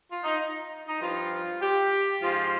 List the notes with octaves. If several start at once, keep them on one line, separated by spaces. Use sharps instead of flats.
F4
D#4
D#4
G2 F3 F4
G4
G#2 F3 F4